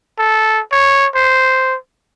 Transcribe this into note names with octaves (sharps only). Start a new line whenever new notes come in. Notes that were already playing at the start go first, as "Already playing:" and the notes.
A4
C#5
C5